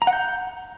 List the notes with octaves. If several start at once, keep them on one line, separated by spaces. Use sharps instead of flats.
A#5
F#5
G6